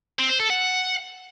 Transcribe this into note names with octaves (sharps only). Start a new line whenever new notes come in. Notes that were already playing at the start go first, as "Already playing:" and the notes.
C4
C5
A4
F#5